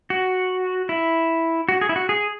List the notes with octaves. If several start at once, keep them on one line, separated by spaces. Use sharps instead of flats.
F#4
E4
F#4
G#4
E4
F#4
G#4